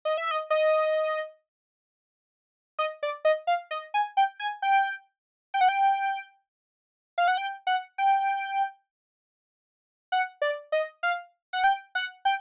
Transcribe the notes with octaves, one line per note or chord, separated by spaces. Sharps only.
D#5
E5
D#5
D#5
D#5
D5
D#5
F5
D#5
G#5
G5
G#5
G5
G5
F#5
G5
F5
F#5
G5
F#5
G5
F#5
D5
D#5
F5
F#5
G5
F#5
G5